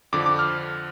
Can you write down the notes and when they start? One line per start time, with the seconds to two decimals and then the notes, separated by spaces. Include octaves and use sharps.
0.13 F2 D3 F3 D6
0.26 D6
0.39 F6